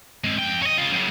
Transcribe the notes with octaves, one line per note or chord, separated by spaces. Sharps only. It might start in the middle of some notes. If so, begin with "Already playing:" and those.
G#3 C4
F2 G5
C#5 D#5
C#3 F4
F#2 C#3